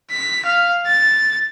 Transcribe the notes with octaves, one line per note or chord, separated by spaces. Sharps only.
B6
F5
A6